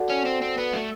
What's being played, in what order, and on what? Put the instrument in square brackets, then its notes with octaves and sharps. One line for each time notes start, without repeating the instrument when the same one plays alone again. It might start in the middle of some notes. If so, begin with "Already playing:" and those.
Already playing: [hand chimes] F#4 A4 D5 F#5 A5
[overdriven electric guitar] C#4
C4
C4
B3
A3